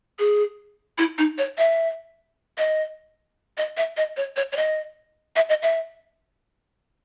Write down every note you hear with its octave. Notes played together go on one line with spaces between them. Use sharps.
G#4
E4
D#4
C#5
E5
D#5
D#5
E5
D#5
C#5
C#5
C#5
D#5
E5
D#5
E5